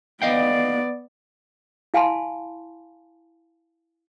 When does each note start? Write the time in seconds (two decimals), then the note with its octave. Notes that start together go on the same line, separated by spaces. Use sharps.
0.22 B3 D5 D#5 F5 G5
1.94 E4 F5 G#5 A5 B5 C6